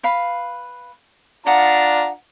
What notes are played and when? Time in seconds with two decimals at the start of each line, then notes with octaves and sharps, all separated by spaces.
0.03 B4 F5 B5
1.47 D4 F4 F#5 A#5 D#6